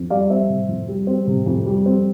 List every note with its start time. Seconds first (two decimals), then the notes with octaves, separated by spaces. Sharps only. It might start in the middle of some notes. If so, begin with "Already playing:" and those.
Already playing: F2
0.10 G3 D5 F5
0.30 C4 C5 E5
0.49 C3
0.68 F2
0.88 G3
1.07 C4
1.27 C3
1.46 F2
1.66 G3
1.86 C4